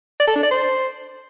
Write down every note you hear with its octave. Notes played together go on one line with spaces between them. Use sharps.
D5
A4
D4
D5
C5